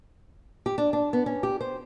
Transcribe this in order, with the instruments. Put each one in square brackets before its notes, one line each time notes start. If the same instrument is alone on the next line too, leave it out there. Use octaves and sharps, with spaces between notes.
[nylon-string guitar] G4
D4
D4
B3
C#4
G4
C5